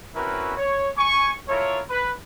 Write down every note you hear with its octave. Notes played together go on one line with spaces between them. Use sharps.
C4 C#4 E4 F#4 A#4 B4
C#5
G#5 C#6
E4 F4 A4 A#4 C#5
B4